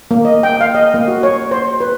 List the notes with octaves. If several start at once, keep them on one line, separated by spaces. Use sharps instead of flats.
A#3
D#5
G5
F5
D#5
A#3
F#4
C#5
C5
B4